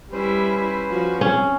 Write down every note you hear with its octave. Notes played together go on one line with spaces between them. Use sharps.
G3 C#4 E4 B4 C5
F3 F#4
C4 C#4